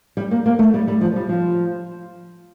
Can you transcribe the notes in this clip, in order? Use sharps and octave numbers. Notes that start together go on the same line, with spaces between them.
G3
A#3
A#3
A3
G3
G3
F3
G3
F3